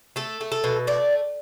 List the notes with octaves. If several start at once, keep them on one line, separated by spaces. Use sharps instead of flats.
A3 A4
A3
A4
B2
A3 D5